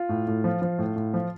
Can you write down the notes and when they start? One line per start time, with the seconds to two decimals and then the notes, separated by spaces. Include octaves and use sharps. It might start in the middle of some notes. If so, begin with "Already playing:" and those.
Already playing: F4
0.09 A2
0.27 A2
0.44 F3
0.62 F3
0.78 A2
0.96 A2
1.14 F3